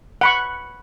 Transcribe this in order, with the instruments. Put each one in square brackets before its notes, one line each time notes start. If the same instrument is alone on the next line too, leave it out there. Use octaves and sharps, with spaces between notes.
[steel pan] F#5 B5 C#6